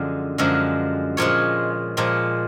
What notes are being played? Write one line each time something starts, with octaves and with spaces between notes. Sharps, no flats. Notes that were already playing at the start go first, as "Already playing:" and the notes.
Already playing: F#2 D3 F3 G#3
F#2 D3 F3 G#3
A#2 F3 G#3 C#5
A#2 F3 G#3